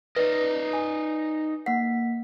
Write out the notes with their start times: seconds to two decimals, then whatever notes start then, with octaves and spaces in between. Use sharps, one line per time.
0.16 D#4 B4 D5 D#5
0.73 G#5
1.66 A#3 F#5 B6